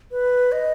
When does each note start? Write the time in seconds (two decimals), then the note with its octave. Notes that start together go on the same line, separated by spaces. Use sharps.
0.11 B4
0.52 D#5